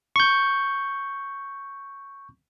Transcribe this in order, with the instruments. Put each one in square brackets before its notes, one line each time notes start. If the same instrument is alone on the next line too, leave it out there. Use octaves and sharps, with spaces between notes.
[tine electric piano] C#6 G6